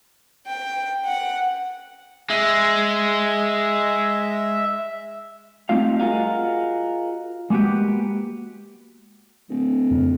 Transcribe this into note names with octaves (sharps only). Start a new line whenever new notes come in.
G5
F#5
G#3 E5
G3 A3 C4 D#4 F4 F5
F4 F#4 G#4 A#4 D#5 F5
G#3 A#3 B3 F#4 G4
D1
F2 C#3